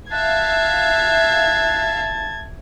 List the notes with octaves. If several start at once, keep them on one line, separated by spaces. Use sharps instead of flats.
E5 F5 A5 F#6 G#6